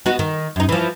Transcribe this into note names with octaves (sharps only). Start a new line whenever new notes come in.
B3 D#4 F#4
D#3
F#2 D#4
E3 F3